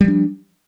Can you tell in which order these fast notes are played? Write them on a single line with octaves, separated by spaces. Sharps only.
G3 F3 D4